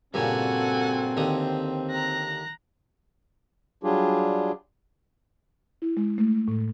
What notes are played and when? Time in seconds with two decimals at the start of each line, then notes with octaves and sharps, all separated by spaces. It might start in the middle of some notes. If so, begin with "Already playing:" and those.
0.14 G2 A#2 C#3 C4 F#4 A4 F#5 G#5
1.17 D#2 D3 D#6
1.91 A#5 F#6 A#6
3.84 F#3 G3 D4 F4 G4 G#4
5.82 E4
5.97 G#3
6.18 A3
6.48 A2